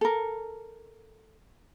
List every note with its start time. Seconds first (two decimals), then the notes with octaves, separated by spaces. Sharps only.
0.01 A4 A#4